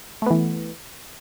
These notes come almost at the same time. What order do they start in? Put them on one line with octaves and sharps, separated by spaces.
A3 B3 E3